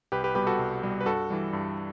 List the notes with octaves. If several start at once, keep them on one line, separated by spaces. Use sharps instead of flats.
C2 G4 B4
G4 B4
B2 G3 G4 B4
F#4 A4
C2
B2 G3
B4
G2 F#4 A4
E3 G3
G2